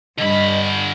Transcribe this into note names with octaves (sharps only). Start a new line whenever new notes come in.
G2 D3 D#5 B5